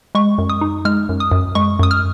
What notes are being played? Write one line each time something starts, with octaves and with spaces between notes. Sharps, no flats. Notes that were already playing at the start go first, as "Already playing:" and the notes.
G#3 C#6
F#2
D#6
D#4
G#3 F6
F#2
D#6
F#2
G#3 C#6
F#2 D#6
F6